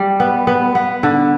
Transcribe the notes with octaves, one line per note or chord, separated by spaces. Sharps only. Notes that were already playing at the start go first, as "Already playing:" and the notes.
Already playing: G3
B3
B3
B3
D3